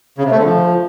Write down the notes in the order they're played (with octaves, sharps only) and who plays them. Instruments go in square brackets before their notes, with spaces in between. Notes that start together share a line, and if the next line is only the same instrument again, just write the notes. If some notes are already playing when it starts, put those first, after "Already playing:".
[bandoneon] C#3
C3
A3
D3
F3